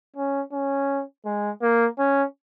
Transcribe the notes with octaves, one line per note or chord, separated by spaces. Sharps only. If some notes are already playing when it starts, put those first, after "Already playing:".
C#4
C#4
G#3
A#3
C#4